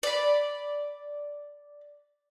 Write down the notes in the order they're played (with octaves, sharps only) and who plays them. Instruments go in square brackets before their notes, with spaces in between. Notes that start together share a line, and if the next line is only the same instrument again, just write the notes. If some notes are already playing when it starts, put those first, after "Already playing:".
[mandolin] D5 B5